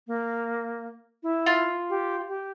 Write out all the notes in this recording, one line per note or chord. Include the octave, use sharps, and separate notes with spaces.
A#3
E4
F4
G4
G4